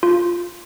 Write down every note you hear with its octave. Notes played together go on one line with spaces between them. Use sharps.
F4